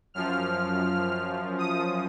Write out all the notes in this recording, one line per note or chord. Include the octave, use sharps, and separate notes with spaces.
F#2 F3 F6
D#6